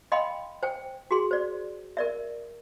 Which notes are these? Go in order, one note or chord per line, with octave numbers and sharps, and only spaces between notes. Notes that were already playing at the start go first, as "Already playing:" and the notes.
D#5 F5 G5 B5 C6
C5 G5
F#4 G#4 C6
C5 D5
A#4 D5 E5